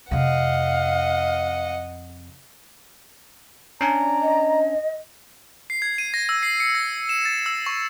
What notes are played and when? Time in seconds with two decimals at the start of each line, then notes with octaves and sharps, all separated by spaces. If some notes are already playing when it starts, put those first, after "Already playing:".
0.11 F2 C3 D#5 F5 F#5
3.81 C#4 D4 D5 G#5 A#5
4.22 D#5
5.70 C7
5.82 G#6
5.98 D#7
6.14 A#6
6.29 E6
6.43 C7
6.60 C#7
6.75 A#6
7.09 E7
7.25 A6
7.46 E6
7.66 C#6